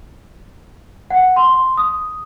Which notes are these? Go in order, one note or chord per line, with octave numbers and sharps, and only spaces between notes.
F#5
C6
D#6